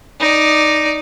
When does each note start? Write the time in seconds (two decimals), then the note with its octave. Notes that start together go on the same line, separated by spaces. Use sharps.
0.20 D#4 D5